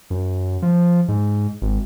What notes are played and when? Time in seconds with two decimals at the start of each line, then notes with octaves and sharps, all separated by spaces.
0.10 F#2
0.62 F3
1.08 G#2
1.62 G#1